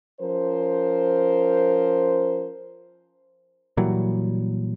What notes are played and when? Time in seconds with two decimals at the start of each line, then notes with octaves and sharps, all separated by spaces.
0.20 F3 C#4 A#4 C5
3.77 A#2 E3 F#3 G3